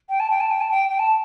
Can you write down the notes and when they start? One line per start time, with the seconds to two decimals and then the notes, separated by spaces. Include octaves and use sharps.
0.09 G5
0.19 A5
0.30 G5
0.40 A5
0.51 G5
0.60 A5
0.70 G5
0.90 G5
0.99 A5